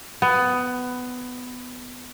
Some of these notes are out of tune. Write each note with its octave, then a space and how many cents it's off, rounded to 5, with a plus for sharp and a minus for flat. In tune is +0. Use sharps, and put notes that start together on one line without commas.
B3 +15